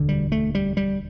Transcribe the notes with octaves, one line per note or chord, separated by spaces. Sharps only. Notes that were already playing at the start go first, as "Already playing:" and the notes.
Already playing: E1 D2 D3
G3
A3
G3
G3